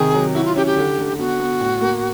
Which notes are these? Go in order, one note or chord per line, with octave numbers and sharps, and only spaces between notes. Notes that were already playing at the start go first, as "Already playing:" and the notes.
Already playing: C3 D#3 G#4
F#3
E4 F#4
F4
C#4 G4
G4
D3
D3
B3 F#4
B3
A2
A#3